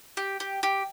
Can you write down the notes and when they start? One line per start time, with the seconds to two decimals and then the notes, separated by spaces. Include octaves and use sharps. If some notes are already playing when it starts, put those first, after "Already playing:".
0.17 G4
0.40 G4
0.63 G4